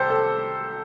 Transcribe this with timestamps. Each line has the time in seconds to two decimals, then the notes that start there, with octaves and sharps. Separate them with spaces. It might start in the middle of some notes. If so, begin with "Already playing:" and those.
Already playing: C2 G4 A4 C5
0.10 A4